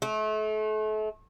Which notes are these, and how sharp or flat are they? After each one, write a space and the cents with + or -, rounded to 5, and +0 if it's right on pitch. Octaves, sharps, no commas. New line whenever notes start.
A3 -35